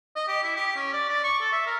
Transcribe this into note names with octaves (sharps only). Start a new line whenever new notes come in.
D#5
G4
E4
G4
C#4
D5
D5
C#6
A4
E5
A#4